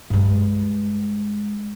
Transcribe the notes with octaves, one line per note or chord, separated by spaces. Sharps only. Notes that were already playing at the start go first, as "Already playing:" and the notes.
G2 G#3